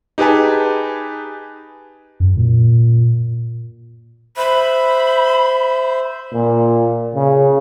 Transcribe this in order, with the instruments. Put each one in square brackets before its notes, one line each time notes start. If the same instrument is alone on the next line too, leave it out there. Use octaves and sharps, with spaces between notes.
[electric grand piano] D#4 G4 G#4 B4 G#5 A5
[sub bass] F#2
A#2
[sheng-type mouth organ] C5 E5 [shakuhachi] B5
[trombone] A#2
C#3